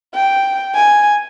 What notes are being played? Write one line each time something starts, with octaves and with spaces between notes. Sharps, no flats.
G5
G#5